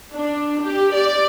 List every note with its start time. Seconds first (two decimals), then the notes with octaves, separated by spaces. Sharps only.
0.13 D4
0.63 G4
0.95 D5